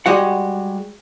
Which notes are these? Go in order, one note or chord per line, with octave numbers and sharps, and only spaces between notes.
G3 G#3 F#4 F#5